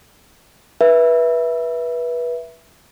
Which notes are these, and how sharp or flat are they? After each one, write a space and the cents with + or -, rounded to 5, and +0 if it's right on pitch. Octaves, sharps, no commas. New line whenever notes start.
B4 -25 E5 +0